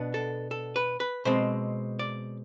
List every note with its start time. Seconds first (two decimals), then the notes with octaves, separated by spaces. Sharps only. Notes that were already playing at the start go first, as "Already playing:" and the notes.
Already playing: B2 B3 D4
0.14 A4
0.51 A4
0.76 B4
1.00 B4
1.25 B2 G#3 C4 C5
1.99 D5